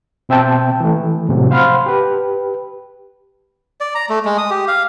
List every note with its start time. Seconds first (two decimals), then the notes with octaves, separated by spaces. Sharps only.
0.29 B2 C4 E5 G5 A5
0.80 E3 A3
1.29 A2 C3 F3 F#3
1.51 C5 F5 F#5 B5 C6 F6
1.86 G4 B4
3.81 D5
3.95 A#5
4.10 A3
4.25 G#3
4.38 D#6
4.50 G4
4.68 F5